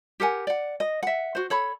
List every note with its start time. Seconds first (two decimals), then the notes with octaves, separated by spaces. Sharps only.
0.20 G4 A#4 F#5 G#5
0.47 D5 F#5
0.80 D#5
1.03 E5 F#5
1.35 F#4 C5
1.50 A4 C#5 B5